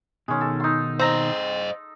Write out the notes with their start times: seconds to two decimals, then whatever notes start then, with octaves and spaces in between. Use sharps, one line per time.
0.28 B2 D#3 G#3 C#4
0.41 A4
0.60 D#4 C6
0.99 C4 C5 D#5 A#5